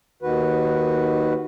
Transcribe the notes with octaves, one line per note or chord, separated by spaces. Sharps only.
D#2 D#3 F#4 B4